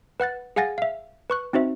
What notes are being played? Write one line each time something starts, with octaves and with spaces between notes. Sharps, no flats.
B4 F#5 F#6 A6
G#4 F5 F#5 G#5 A6 A#6
E5 F5
B4 C#6 F#6
C4 D#4 F#4 C5 E5